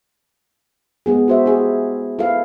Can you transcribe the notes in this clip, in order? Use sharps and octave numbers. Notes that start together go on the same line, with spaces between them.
G#3 B3 G#4
F#4 C5 E5
E4 G4 G#4
E4 A4 B4 F5